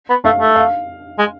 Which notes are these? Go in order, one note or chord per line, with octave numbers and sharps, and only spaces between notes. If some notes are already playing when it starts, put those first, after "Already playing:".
B3
A3 F5
A3
F5
G#3